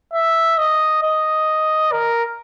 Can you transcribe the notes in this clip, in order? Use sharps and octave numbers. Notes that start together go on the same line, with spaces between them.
E5
D#5
D#5
A#4